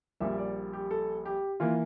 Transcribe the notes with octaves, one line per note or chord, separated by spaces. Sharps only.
A#1 A#2 G3 A#3 E5
D5
G4
A4
G4
E3 A#3 F4